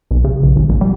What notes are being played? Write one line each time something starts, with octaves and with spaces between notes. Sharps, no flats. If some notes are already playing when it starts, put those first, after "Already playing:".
B1
C#3
B1
G#1
A#1
G3